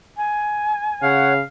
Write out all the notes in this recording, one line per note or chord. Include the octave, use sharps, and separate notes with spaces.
G#5
C#3 C#5 F5 F#5